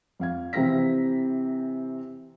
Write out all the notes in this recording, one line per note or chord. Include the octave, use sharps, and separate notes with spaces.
F2 F5 G#6
C3 E3 C4 A#5 A#6 B6